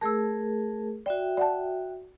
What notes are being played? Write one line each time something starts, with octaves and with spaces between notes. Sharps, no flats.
A3 G#4 A#4 A5 E6
F#4 D5 E5 G5
D5 F#5 A5